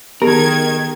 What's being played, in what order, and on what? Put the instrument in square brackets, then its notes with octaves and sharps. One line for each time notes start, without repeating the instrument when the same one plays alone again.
[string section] D#3 G#6 [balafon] B3 [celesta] G4 G#4 F7 [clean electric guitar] A#4